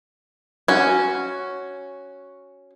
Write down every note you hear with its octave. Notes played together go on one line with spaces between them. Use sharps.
C#4 F#4